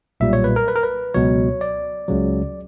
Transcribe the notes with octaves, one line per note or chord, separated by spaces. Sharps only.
B1 A#2 G3 E5
C#5
B4
A#4
B4
A#4
B4
C#2 B2 F#3 C#5
D5
C#2 C#3 F#3